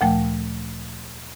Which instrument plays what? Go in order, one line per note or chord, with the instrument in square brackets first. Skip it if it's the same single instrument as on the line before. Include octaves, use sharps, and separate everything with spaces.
[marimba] D2 A#2 F3 A3 G5